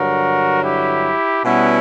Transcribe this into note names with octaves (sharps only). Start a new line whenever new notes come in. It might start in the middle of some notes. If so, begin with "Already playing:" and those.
Already playing: G2 D3 F#3 F#4 A#4
E4 G4
B2 G3 B3 C#4 E4